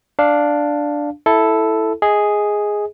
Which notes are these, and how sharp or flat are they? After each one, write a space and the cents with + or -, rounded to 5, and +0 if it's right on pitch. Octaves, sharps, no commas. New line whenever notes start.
D4 +0 F5 +0
E4 +0 A4 +0
G#4 +0 D#5 +20